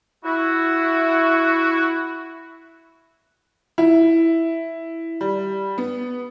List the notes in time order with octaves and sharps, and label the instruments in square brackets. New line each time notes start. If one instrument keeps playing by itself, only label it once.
[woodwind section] E4 F#4
[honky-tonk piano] E4
G3
B3